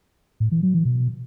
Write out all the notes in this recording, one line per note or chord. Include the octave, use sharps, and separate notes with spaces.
A2
E3
F#3
E3
B2